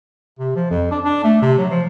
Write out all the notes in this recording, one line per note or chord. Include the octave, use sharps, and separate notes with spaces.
C3
F3
F2
D4
D4
A3
C3
F#3
F3